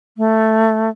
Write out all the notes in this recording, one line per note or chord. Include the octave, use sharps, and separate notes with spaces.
A3